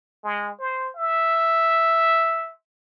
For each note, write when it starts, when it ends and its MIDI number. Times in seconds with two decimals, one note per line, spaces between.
0.24 0.51 56
0.59 0.90 72
0.96 2.52 76